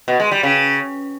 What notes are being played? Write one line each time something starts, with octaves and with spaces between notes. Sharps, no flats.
B2
G#3
G3
C#3